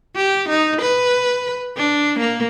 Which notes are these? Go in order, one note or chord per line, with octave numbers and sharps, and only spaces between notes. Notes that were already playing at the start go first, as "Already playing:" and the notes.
G4
D#4
B4
D4
A#3